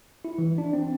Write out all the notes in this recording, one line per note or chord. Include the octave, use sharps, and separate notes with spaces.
E4
E3
D4
C4